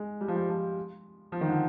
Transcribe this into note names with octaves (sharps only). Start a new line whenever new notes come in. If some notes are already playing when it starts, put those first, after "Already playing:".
Already playing: G#3
G3
F3
G3
F3
F3
D#3
D3